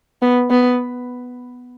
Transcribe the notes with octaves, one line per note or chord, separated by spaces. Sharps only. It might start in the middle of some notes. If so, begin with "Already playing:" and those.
B3
B3